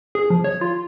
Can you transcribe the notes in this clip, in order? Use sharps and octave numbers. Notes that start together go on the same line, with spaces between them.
G#4
F3
C#5
F4